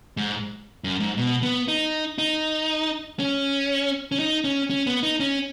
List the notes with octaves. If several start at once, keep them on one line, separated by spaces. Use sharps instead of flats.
G#2
F#2
G#2
B2
B3
D#4
D#4
C#4
C#4
D#4
C#4
C#4
B3
D#4
C#4